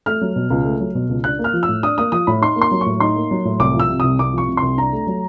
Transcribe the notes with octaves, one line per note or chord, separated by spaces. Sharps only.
A3 F6
F#3
B2
C#2
A3
F#3
B2
C#2
D4 F#6
A#3
F6
F3
E6
A2
D4 D#6
A#3 D#6
F3 D#6
A2 B5
D#4 C6
A#3
C6
F#3
C#6
A2
D#4 C6
A#3
F#3
A2
C2 D6
F3
E6
C3
C2 D#6
C2 D6
F3 C#6
C3
C2 C6
D4 A#5
A3
F#3